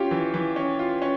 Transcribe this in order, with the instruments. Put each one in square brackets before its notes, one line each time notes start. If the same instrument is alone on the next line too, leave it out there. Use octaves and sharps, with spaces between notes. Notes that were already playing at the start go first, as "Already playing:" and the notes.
Already playing: [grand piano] C#4 F4 [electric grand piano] G4
[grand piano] E3
E3
C#4
F4
C#4